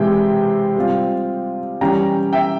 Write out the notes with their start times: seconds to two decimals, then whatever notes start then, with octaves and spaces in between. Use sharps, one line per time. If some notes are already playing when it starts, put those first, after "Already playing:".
Already playing: C3 E3 G#3 E4 G5
0.76 G3 C4 F4
1.81 E3 G3 C#4 G5 A#5
2.33 E5 G5